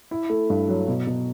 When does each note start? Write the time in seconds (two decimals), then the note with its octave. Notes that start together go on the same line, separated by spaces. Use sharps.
0.11 E4
0.30 A3
0.50 G2
0.69 F#3
0.88 B2
1.07 B2